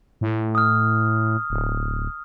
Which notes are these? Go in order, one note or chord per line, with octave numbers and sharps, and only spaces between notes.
A2
D#6 F6
D1